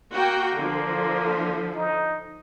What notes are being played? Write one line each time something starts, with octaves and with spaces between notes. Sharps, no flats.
A#3 F#4 G5
D3 F3
D#4